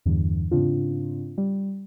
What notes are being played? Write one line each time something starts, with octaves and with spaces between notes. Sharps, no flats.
E2 G2 D3 E3
G#2 C#3 C4 D4 F4
G3